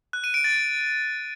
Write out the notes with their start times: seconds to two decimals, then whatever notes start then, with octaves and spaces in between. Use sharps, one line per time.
0.13 F#6
0.24 D#7
0.34 D7
0.44 A6